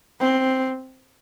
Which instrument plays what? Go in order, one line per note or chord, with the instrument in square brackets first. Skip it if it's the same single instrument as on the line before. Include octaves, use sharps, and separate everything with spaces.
[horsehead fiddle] C4